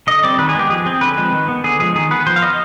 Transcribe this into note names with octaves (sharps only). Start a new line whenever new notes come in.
D3 D#5
G3 C4 D5
D#3 B4
G#4
G#3 B3 G4
F3 G#4
C4
D3 B4
F3 G#3 C4
D#3
B3
D3 G#4
F3 G#3 G#4
D#3 G#4
B3 B4
F3 C5
F5
B3 D#5